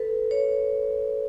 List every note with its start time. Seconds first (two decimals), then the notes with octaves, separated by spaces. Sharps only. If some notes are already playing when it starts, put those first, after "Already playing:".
Already playing: A4 B4
0.31 C#5